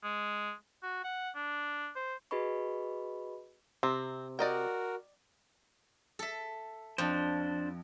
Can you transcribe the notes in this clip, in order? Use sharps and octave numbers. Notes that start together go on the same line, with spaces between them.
G#3
F#4
F#5
D4
C5
F#4 G#4 B4 D#5 B5 C#6
C3 C4
F#4 A#4 D5 D#5 G5
A4 E5
F2 D4 C5